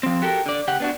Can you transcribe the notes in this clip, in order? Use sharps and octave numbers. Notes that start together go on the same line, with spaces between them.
F3 C4
F#4 G4 A4 A#4
D3 D5
C#3 G4 F#5
B3 D4 F#4